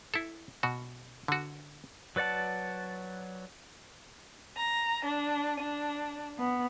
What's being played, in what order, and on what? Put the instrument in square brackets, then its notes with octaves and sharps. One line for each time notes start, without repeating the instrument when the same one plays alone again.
[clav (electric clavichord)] E4 A4
B2 F#4
D3 F#4
[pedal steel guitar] F#3 B4 D5 F#5 A5
[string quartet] A#5
D4
D4
B3